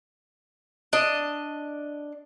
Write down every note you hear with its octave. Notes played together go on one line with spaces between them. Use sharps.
D4 D#5